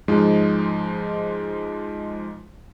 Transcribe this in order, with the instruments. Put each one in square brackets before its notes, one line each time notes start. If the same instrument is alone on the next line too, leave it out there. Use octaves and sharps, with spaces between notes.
[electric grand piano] G#2 F3 G#3 D#4